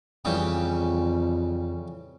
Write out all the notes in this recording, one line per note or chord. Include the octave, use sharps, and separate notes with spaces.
F2 C#3 E3 G3